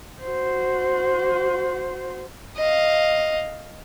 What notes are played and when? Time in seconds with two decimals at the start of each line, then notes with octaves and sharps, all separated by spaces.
0.22 F#4 C5
2.57 D#5 F5